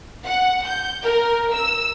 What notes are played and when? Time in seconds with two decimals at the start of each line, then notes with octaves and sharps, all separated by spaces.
0.24 F#5
0.66 G6
1.03 A#4
1.54 E6